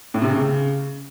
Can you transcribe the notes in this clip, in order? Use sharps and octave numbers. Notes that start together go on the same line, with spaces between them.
A2
C3
C#3